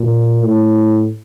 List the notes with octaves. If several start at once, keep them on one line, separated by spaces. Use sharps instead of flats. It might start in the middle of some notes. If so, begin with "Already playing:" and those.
Already playing: A#2
A2